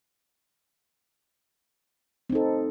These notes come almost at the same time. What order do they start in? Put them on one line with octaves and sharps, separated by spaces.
C4 D#4 A4